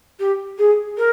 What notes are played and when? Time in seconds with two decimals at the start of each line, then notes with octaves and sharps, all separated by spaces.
0.19 G4
0.58 G#4
0.97 A#4